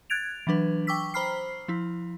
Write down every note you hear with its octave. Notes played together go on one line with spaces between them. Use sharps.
F#6 G#6 A6 D7 F7
E3 F#3 D4 B4
G5 C#6 D6 E6 B6
C5 A#5 B5 F6 C7
F3 E4